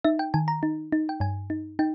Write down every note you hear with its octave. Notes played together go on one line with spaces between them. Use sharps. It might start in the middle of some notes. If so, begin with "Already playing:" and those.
D#4 E5
G5
D#3 G#5
A#5
D#4
D#4
G5
G2 G#5
D#4
D#4 G5